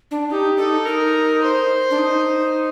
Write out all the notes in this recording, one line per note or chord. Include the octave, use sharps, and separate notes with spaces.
D4
D#4 G4
D#4 A4
D#4 A#4
C5
D4
D#4